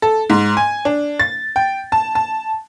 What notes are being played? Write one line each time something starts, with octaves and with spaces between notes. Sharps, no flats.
A4
G#2
G#5
D4
A6
G5
A5
A5